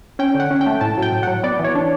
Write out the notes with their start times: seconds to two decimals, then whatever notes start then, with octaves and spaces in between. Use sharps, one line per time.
0.19 C#4 G5
0.34 D3
0.40 F#5
0.51 C#4
0.61 G5
0.66 A3
0.81 A2 A5
0.97 F#3
1.02 G5
1.12 A2
1.23 F#3 F#5
1.43 B3 D5
1.59 E3
1.64 C#5
1.75 D4